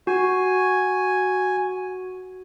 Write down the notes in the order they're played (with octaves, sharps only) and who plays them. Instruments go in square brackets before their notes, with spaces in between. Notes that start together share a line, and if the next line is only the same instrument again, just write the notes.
[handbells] F#4 [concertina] G#5